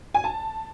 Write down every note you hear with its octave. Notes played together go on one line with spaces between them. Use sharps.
G#5
A5